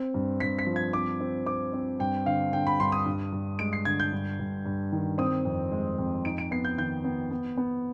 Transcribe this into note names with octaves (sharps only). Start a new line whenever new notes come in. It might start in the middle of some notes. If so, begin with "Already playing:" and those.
Already playing: C4
G2
G2 B6
B6
F3
G#6
C4 D6
C4
C4 D6
C4
G2 G5
D3 F5
D3 G5
B5
G2 C6
D#6
G2
G2
G#3 D7
C7
D3 G#6
G6
G2
G2
G2
D#3
C4 D#6
F2
G#3
F2
D#4 D7
D7
B3 C7
G6
D#3 G6
B3
B3
B3